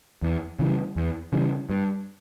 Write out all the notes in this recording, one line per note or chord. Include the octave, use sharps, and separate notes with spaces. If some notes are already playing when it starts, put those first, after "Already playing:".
E2
C#3 E3 G3
E2
C#3 E3 G3
G2